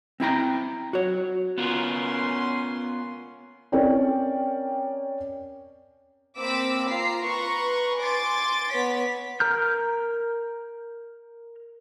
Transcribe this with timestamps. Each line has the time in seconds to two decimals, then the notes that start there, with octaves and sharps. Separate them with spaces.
0.20 C4 E4 G5 A#5
0.93 F#4 C#5
1.58 B3 C#4 F4 A#4 C6
3.72 C4 C#4 A#4 C#5 D5 G5
6.39 A#3 C4 B5 D6 E6
6.90 F4 A#5 C7
7.25 B4 A#5 C6 C#6
7.98 G#5 C6 D6 A6
8.73 B3 C#5 B6
9.40 A#4 A#5 F6 G6